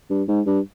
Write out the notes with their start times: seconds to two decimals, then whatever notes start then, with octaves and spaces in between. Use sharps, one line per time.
0.10 G2
0.28 G#2
0.46 G2